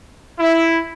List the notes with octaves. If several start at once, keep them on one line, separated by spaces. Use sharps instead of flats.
E4